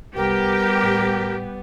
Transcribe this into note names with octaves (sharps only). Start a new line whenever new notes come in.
C2 G3 B3 G4 A#4
A2